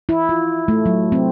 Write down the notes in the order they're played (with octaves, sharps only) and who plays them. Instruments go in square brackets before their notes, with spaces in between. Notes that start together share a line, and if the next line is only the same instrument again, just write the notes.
[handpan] E4
F4
A3
F#3
C4